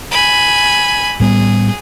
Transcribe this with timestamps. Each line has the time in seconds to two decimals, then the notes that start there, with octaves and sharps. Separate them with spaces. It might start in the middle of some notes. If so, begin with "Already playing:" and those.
0.11 G#5 B5
1.20 A2 G3 B3 G#4